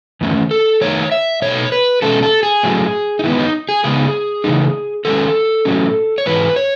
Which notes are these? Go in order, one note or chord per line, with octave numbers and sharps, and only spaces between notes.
E2 D#3 A3 C#4
A4
D#3 A3 D#4 C#5
E5
B2 A3 D#4 C#5
B4
B2 G#3 C#4 A4
A4
G#4
A2 F#3 A3 C#4
D#4
D#3 G#3 B3 E4
D#4
G#4
C#3 G#3 B3 D#4 G#4
C#3 E3 A3 D#4
D#3 G#3 C#4 A4
A2 F#3 C#4
C#5
G#2 E3 B4
C#5